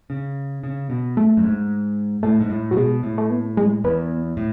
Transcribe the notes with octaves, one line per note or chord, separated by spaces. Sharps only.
C#3
C#3
B2
A3
F#2
G#2
A2 A3
G#2
A2
A2 F#3
B2 G#3
A2
A3
B3
G#3
E2 B3
A2